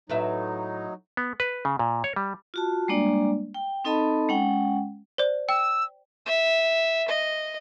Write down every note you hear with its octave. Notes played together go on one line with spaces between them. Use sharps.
A2 F#3 D#4 B4 E5
B3
B4
C#3
A#2
C#5
G3
F4 F#4 A5
G3 G#3 A#3 D4 D5
G5
C4 D#4 A4 D#5 A5 B5
G#3 C#4 F#5 G5
C5 D5
G5 E6
E5
D#5